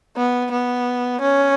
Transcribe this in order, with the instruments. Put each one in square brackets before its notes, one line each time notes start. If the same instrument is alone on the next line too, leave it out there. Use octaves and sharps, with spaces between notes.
[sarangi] B3
B3
C#4